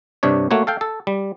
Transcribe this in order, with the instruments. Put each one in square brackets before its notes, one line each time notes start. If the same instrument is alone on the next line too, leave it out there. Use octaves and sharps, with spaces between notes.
[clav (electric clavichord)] G2 C3 D4 C#5
A3 A#3 F#4 C#5
A4 F5 G5
A4
G3